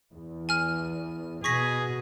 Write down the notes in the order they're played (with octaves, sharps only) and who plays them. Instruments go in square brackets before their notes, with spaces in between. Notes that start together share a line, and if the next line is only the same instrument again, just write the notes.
[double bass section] E2
[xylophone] G#5 F6
[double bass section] B2 [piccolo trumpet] G#4 [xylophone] C#6 A#6 B6